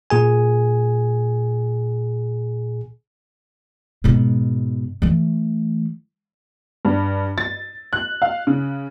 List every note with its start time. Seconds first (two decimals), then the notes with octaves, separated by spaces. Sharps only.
0.10 A#2 G#4 G#5
4.04 G#2 B2
5.02 E3 A3
6.85 G2
7.38 A6
7.93 F#6
8.22 F5
8.47 C#3